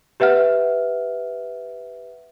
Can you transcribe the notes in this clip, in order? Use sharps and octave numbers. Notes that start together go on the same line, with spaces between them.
G4 B4 E5 F#5 F6